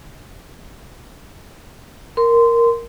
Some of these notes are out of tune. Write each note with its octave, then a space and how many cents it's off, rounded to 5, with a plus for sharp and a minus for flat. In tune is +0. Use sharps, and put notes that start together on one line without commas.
A#4 +0 C6 -15